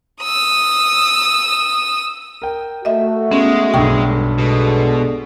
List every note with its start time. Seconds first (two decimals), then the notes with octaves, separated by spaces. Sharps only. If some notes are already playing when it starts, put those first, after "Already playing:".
0.23 D#6 E6
2.42 A#4 G5
2.85 A3 F#4 D#5 E5
3.32 G#3 B3 C#4
3.74 B1 G2 G5 C#6
4.38 B2 G#3 D4 A4